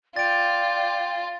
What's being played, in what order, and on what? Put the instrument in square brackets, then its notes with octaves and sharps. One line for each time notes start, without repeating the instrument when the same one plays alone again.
[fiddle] F4 [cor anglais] D5 [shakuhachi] G5 [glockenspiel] A6 D7